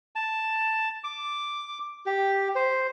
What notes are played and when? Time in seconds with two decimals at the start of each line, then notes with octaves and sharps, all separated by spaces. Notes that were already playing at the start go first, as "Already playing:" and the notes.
0.16 A5
1.04 D6
2.06 G4
2.55 C5